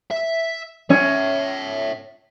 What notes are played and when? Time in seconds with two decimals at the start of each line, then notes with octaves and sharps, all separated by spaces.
0.11 E5
0.90 C#4 C#5 E5